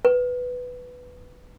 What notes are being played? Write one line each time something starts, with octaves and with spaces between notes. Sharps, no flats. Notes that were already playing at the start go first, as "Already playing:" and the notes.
B4